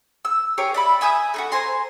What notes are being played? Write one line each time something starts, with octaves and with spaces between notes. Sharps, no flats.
E6
G4 G#4 A#4 C#5
D5 E5 B5
E5 G#5 D#6 G6
A3 D#4 F#4
C5 G#5 A#5 C6